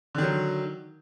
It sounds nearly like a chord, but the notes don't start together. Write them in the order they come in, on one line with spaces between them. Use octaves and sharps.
D3 D#3 F#3